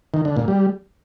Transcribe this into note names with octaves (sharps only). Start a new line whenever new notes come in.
D#3
D3
A#2
G3